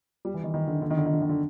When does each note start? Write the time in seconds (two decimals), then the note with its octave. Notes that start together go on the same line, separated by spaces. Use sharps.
0.25 G3
0.34 E3
0.44 D#3
0.54 D#3
0.67 D3
0.82 D3
0.90 D#3
0.97 D3
1.06 D#3
1.13 D3
1.22 D#3
1.29 D3